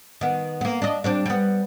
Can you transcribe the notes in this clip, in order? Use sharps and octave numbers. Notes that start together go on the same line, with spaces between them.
D#3 B3
A#3 B3
D4 D#5
G3 C4 D4
G3 B3